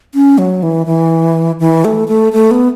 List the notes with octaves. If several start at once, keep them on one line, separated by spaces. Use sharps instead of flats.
C#4
F#3
E3
E3
E3
A3
A3
A3
B3